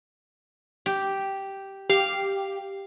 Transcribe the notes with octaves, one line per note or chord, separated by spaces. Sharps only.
G4
G4 F5